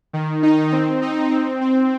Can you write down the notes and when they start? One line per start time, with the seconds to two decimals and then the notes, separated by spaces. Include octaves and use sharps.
0.13 D#3
0.43 D#4
0.72 C4
1.02 D#4
1.31 C4
1.61 C4